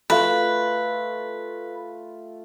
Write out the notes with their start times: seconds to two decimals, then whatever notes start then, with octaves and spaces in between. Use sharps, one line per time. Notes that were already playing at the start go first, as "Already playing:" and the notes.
0.10 A3 F4 B4 F5